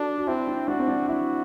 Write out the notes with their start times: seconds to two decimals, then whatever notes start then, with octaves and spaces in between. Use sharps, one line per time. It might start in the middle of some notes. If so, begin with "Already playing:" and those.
Already playing: D4 F#4 A4
0.18 F#4
0.27 C4 E4
0.47 D4
0.68 D4 F#4
0.79 C4
0.88 D4
1.08 E4 F#4